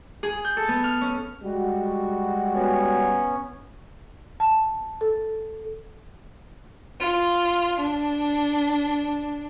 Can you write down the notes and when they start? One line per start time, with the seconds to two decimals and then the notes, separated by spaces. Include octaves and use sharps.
0.23 G#4
0.45 G6
0.57 A4
0.68 B3
0.84 F6
1.01 C#4
1.43 G3 G#3 F#4
2.54 B3 C#4
4.40 A5
5.01 A4
7.01 F4
7.80 D4